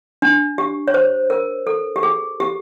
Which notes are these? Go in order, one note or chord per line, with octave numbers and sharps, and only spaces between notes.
D4
G4
C#5
C5
A#4
A4
G4
G#4
G4